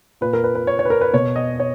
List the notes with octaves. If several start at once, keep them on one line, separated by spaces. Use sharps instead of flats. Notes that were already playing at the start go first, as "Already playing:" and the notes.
A#2 B4
A#4
B4
B4
C#5
C#5
B4
A#4
B4
B2 C#5
D#5
C#5